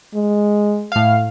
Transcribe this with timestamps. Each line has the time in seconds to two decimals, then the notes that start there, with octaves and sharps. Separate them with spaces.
0.14 G#3
0.92 A2 F5